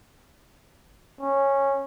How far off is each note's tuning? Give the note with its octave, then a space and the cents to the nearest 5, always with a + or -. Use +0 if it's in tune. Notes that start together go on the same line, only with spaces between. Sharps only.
C#4 -10